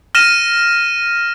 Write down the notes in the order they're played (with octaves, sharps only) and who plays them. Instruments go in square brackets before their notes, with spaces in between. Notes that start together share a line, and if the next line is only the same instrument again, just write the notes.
[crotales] F6 A#6 D#7 E7